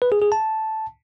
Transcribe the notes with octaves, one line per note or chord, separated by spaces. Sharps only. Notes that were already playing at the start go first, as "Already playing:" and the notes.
B4
G#4
G#4
A5